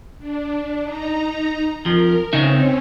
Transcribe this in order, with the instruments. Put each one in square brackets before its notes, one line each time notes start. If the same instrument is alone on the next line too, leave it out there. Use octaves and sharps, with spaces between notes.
[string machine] D4
D#4 A#5
[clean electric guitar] F2 F3 [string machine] A#4
[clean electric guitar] C#3 D#4 E5 [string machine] C4 C#4